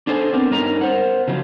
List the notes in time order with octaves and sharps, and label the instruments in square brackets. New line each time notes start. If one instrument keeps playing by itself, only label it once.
[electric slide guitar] D4 G#4 A4 C5 G#5
B3 C4 D4 A#4
G2 C#4 D#4 A#4 A#5
A#4 C5 F#5
C#3 F3 F#3